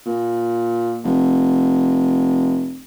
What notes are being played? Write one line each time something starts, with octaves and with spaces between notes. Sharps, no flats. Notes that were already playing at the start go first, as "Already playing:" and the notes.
A#2
F1